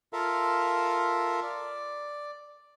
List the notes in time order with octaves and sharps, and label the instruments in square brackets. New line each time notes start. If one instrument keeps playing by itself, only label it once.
[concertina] F4 A4 A#4 E5 F5
D5